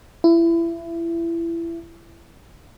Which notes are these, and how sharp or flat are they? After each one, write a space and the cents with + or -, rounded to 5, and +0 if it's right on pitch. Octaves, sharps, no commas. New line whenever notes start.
E4 +25